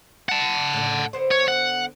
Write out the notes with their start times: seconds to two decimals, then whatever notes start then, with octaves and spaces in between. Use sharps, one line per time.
0.29 F#5 A5
0.74 A2 D3
1.13 D3 B3 C5
1.31 C#5
1.48 F#5